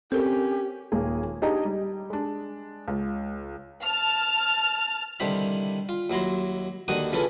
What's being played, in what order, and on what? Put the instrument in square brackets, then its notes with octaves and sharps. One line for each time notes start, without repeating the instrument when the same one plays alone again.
[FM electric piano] C4 [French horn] C#4 [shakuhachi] G4 [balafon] A4 A#4
[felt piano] D#1 A#3 G#4
D4 D#4 G4 G#4 D#5
G3
G#3 D4
C#2
[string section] A5 F6
[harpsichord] C2 D3 D#3 C5 E5 B5
F4
D#2 F#3 E4 A#5 C6
D#2 D3 D#3 D#4 F#4 D#6
C#3 E3 C#4 E4 F4 A4